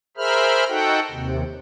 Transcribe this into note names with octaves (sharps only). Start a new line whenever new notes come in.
G#4 A#4 C5 E5 B5 F6
D#4 F#4 A4 F#5 G5
D#2 C3